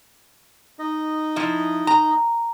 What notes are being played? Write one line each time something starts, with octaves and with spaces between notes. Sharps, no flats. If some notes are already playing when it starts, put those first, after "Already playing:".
D#4 D#5
F3 E4
A#5